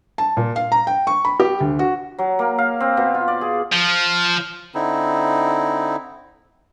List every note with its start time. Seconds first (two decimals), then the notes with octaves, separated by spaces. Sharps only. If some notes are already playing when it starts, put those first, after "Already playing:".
0.18 A5
0.37 A#2
0.56 F5
0.72 A#5
0.87 G5
1.07 C#6
1.25 B5
1.40 G4
1.61 D2
1.79 F#4
2.18 F#3
2.39 A#3
2.58 F5
2.80 C4
2.97 B2
3.14 F4
3.28 D5
3.41 G#4
3.72 F3
4.74 D3 C4 D#4 E4